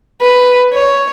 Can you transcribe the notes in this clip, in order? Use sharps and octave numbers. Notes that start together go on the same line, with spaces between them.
B4
C#5